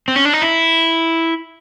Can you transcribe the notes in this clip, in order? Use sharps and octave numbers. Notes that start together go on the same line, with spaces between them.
C4
C#4
D4
D#4
E4